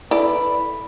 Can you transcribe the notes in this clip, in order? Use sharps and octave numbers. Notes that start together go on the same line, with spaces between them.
E4 A4 B4 D5